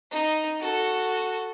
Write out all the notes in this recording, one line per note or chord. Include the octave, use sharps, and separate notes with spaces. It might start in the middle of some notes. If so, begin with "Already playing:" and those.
D#4
F#4 A4